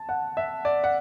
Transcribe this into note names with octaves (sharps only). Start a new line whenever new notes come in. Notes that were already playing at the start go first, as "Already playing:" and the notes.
Already playing: A5
F#5
E5
D5
F#5